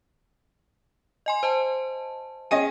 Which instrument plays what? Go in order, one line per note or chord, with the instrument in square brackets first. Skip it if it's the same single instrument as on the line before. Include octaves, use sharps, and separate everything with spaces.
[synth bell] D#5 G#5 C6
C5 D#5 A5
[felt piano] C#4 D#5 D#7 [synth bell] G#4 G5 G#5